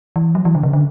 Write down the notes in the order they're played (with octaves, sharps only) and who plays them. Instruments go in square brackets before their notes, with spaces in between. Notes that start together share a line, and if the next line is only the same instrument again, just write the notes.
[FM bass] E3
F#3
E3
D3
C#3
D3